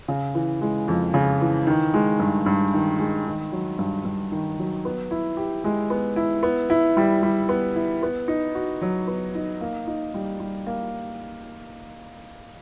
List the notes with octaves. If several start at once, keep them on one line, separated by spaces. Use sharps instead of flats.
C#3
E3
G#3
F2
C#3
E3
D#3
G#3
G2
G2
D#3
G#3
D#3
F#3
G2
G2
D#3
F#3
B3
E4
G4
G#3
B3
E4
B3
E4
G3
G3
B3
E4
B3
D#4
F#4
F#3
B3
D#4
A#3
D#4
G3
G3
A#3